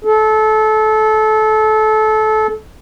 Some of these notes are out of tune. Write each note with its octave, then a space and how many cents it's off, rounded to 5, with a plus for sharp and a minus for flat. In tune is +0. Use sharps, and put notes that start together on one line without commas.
A4 -25